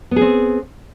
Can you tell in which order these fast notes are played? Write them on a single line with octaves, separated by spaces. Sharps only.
B3 G#4 C4